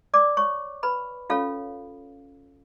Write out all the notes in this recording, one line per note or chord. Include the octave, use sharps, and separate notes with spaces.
D5 D6
C#5 C#6
B4 B5
C#4 F4 A4 C#5 F5